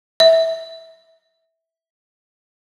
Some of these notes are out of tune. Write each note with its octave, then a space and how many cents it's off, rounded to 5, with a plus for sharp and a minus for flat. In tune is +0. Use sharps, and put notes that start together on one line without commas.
E5 -15